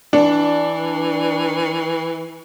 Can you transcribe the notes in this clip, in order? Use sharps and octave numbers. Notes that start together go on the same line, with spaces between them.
E3 D4